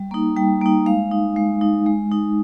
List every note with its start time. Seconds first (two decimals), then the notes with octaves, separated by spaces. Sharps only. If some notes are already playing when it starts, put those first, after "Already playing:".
Already playing: G3
0.11 A#3 D#4
0.36 G3 G5
0.61 A#3 D#4
0.86 G#3 F5
1.11 D#4
1.36 G#3
1.61 D#4
1.86 G#3
2.12 D#4